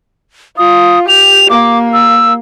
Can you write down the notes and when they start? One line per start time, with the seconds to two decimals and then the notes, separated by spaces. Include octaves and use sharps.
0.58 F4 D#6
1.08 G4 F7
1.50 A#3 D6
1.93 E6